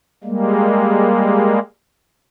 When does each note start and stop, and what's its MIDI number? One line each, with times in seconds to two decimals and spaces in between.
0.24 1.59 55
0.24 1.59 56
0.24 1.59 58